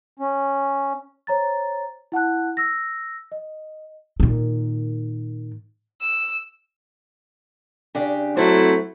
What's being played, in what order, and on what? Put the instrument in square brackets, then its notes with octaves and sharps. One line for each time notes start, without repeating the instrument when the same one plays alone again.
[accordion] C#4
[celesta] C5 C#5 A#5 A6
E4 F#5 A5 F#6
E6 A#6
D#5
[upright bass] A#2 D#3
[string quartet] E6
[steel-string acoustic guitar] C#3 D4 G4
[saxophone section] F#3 A3 E4 [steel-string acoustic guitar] C4 A4 C5